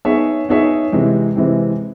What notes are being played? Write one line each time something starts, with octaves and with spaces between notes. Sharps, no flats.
B3 D#4 G#4 C#5 E5
B3 D#4 G#4 C#5 E5
C3 E3 G#3 C4
C3 E3 G#3 C4